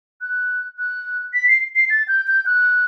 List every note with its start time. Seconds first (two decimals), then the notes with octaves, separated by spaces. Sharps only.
0.21 F#6
0.78 F#6
1.34 B6
1.48 C7
1.75 C7
1.90 A6
2.08 G6
2.27 G6
2.46 F#6